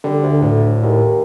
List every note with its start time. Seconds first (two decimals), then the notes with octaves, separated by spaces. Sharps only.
0.04 D3 G3
0.23 D2
0.42 A2
0.83 D#2